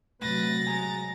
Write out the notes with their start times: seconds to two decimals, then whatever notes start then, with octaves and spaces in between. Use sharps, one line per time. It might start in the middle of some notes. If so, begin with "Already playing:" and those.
0.22 C3 F#3 A3 B4 A6 A#6
0.67 G#3 G#5 A#5